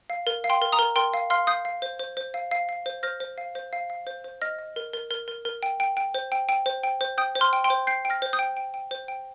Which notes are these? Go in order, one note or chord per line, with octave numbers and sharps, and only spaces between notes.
F5
A#4
F5
G5 C6
A#4
A#5 D#6
A#4
A#4 G5 C6
F5
F5 C6 F6
F5 D#6 G6
F5
C5
C5
C5
F5
F5
F5
C5
C5 F6 A#6
C5
F5
C5
F5
F5
C5
C5
D#5 F6 A#6
D#5
A#4
A#4
A#4
A#4
A#4
G5
G5
G5
C5
G5
G5
C5
G5
C5
G5 D#6 G6
C5
C6 F6
G5
G5 C6
C5
G5 G6 C7
G5
F6 A#6
C5
D#6 G6
G5
G5
G5
C5
G5